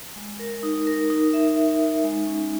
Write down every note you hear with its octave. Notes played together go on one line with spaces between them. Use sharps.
G#3
A#4
D#4
A#4
D#4
E5
E5
D#4
G#3
C#4